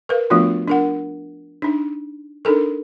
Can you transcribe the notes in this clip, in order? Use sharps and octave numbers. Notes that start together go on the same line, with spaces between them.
A#4 B4 F5
F3 A3 B3 D4 F4 F#4
D4 A#4 F#5
D4 D#4
D4 D#4 A4 A#4